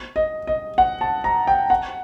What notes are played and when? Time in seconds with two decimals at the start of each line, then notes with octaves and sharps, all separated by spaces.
0.16 D#5
0.47 D#5
0.78 F#5
1.01 A5
1.24 A#5
1.47 G5
1.70 F#5